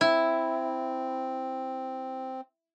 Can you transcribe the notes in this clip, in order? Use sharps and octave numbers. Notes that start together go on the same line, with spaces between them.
C4 E4